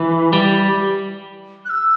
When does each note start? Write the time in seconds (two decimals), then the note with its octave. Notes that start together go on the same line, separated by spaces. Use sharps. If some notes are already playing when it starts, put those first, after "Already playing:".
Already playing: E3
0.33 G3
1.65 F#6
1.70 E6